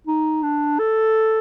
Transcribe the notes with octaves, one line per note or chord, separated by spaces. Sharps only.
D#4
D4
A4